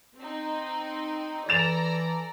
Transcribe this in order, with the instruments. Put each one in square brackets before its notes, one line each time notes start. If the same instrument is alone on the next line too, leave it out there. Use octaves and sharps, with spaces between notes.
[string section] C4 D#4
[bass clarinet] E3 [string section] A4 D5 A#5 [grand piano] A6 E7 F7